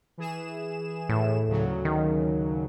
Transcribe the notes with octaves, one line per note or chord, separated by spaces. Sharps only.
E3 G#4 E7
A2
D2 C#3 F#3
D#3